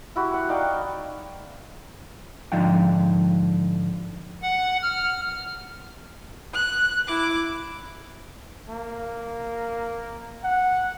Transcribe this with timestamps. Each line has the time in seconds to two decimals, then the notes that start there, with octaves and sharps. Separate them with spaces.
0.16 E4 F#4 G4
0.34 F#5
0.49 D#4 D5 F5 G5
2.52 G#2 D3 F3 D#4 F5 G5
4.42 F#5
4.83 F6
6.54 F#6
7.07 E4 D6
8.69 A#3
10.44 F#5